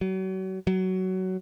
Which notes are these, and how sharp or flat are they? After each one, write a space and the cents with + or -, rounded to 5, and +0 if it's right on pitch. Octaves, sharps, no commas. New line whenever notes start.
F#3 +35
F#3 +15